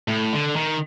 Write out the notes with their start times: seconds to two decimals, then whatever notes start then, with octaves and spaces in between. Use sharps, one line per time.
0.08 A2
0.33 D3
0.56 D#3